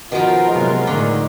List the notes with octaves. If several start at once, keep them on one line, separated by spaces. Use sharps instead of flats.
B2 D#3 F3 F4 A#4
C3 F#3 G#3 B3
A2 D3 D#3